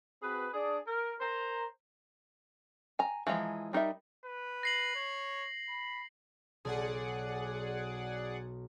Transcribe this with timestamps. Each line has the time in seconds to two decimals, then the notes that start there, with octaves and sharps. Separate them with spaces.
0.22 C4 F#4 G#4 B4
0.53 D4 G#4 D5
0.87 A#4
1.20 A#4 C5 A#5
2.99 G#5 A#5
3.27 E3 F3 G#3 A#5
3.73 G3 D#4 A#4 E5
4.25 B4
4.63 A#6 C7 F#7
4.95 C#5
5.69 B5
6.65 B1 G#4 D5 F#5